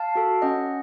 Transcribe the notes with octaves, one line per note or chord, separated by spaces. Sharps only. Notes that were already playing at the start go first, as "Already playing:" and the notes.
Already playing: F5 A5
F#4 A4
C#4 D#5 F#5